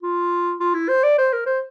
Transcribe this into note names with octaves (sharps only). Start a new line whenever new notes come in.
F4
F4
E4
C5
D5
C5
A#4
C5